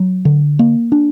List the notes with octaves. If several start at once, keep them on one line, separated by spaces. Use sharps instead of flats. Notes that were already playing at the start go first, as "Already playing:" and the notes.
Already playing: F#3
D3
A#3
D4